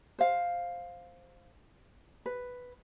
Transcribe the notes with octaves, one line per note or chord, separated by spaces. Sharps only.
C5 F5
B4